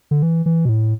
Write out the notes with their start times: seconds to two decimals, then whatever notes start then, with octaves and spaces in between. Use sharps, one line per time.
0.11 D3
0.23 E3
0.46 E3
0.65 B2
0.69 A2